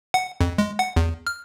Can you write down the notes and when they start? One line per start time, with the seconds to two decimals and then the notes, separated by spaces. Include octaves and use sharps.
0.14 F#5
0.41 F2
0.58 G#3
0.79 F#5
0.96 E2
1.27 F6